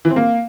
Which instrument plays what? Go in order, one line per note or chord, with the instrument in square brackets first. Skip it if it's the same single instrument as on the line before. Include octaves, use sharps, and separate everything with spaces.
[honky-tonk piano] E3
C4
A#3